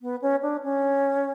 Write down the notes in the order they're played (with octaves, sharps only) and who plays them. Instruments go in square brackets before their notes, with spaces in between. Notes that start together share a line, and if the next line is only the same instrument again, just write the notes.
[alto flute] B3
C#4
D4
C#4